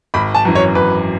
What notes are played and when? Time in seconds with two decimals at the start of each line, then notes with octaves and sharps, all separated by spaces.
0.14 G#1 B5
0.35 A5
0.45 F#2 E3
0.55 C#5
0.75 G#1 B4